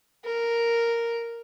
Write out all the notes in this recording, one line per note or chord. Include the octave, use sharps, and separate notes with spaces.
A#4